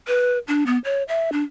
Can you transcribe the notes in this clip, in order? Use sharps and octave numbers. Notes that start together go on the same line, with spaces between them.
B4
D4
B3
C#5
E5
D4